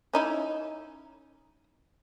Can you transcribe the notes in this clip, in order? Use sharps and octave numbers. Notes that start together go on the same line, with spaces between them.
C#4 D#4 E4